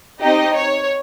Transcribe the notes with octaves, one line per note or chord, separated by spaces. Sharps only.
C4 D#4 G4 D#5
C#5